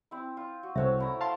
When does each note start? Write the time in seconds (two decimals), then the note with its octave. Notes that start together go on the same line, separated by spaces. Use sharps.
0.11 C4 E4
0.37 F4
0.63 F#4
0.76 C2 A3 C5 C#5 E5 A5
0.98 A3 E4 A#5
1.21 F5 A5 C6